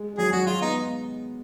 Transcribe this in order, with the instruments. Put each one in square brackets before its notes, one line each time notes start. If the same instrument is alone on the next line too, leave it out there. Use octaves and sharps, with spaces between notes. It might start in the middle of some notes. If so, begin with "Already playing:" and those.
Already playing: [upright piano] G#3
G#3
[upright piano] F#3 [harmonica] G#4
[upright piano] F#3 [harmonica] F#4
[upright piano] G#3 [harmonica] F4
[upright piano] B3 [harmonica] D#4